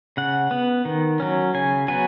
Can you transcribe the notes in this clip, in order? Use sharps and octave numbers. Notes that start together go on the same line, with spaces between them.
C#3 F#5
B3
D#3
F#3 C#4
C#3 G#5
F#3 B3 G#5